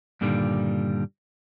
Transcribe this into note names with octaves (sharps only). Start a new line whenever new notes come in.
G2 A#2 D3 D#3 G3